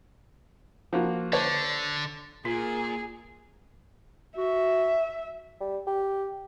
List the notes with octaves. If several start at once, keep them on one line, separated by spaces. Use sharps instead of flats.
F3 A#3 F#4
D3 C5 C#5 A5
A#2 A#3 F4 G#4
F#4 E5
G3
G4